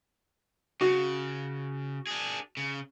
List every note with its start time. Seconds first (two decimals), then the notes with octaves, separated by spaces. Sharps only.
0.81 C#3 F#4
2.07 D4 G#4
2.57 C#3